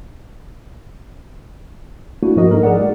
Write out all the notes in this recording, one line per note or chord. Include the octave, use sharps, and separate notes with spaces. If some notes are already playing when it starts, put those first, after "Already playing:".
A3 A#3 D4 E4 F#4
G#2 F3 F#4 A#4 D#5
D#4 A4 A#4
G#4 A#4 D5 F#5
G#3 D5